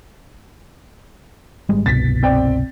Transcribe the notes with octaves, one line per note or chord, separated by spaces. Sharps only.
G#1 G3 G#3
G1 C2 B2 A6 B6
C4 D5 G5